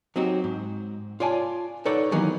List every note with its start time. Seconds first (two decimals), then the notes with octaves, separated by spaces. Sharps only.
0.16 F#3 C4 D#4 F#4 G4
0.44 G#2
1.20 F4 C#5 D5 G#5 A5
1.85 D#4 A4 B4 C#5 D5 F#5
2.12 D#3 E3 F#3 A#3 B3 D#4